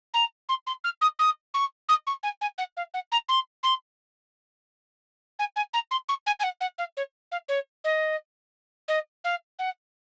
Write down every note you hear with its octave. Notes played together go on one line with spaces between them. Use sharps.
A#5
C6
C6
F6
D#6
D#6
C#6
D#6
C#6
G#5
G#5
F#5
F5
F#5
A#5
C6
C6
G#5
G#5
A#5
C6
C#6
G#5
G#5
F#5
F#5
F5
C#5
F5
C#5
D#5
D#5
F5
F#5